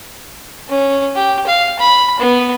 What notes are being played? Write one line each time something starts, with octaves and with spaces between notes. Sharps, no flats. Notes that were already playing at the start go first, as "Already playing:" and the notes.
C#4
G4
F5
B5
B3